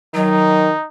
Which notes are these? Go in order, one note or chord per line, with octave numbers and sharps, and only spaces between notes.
D#3 F#3 D#4